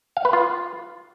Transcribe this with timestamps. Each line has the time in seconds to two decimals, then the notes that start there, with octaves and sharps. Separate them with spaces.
0.17 F5
0.25 B4
0.33 F4